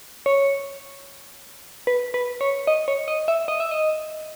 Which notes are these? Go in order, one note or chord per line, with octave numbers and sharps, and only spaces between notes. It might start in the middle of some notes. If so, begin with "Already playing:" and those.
C#5
B4
B4
C#5
D#5
C#5
D#5
E5
D#5
E5
D#5